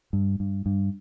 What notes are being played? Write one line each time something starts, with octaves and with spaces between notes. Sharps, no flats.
G2
G2
G2